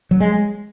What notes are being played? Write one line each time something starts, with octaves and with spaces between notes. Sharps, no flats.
F#3
G#3